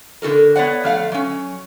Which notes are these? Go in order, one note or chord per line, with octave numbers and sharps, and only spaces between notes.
D3 F#4 A4 A#4
B3 C#5 D5 F#5
F2 A3 F5 F#5
F#3 C#4